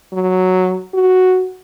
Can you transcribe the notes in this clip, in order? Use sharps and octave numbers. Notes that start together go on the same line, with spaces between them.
F#3
F#4